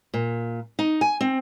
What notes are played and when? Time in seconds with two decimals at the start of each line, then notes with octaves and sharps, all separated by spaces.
0.14 A#2
0.79 D#4
1.01 G#5
1.21 C4